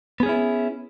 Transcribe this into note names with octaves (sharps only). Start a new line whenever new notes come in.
B3 C#4 E4 G#4